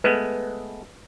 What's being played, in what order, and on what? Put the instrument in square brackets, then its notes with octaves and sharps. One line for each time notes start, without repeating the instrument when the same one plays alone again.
[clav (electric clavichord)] G#3 A3 B3 [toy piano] B4